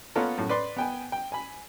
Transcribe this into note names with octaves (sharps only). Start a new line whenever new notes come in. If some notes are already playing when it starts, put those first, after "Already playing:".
A#3 B3 C#4 F4 A4 A#4
F#2 A2
B4 D5 C6
B3 G5 G#5
G5
G#5 B5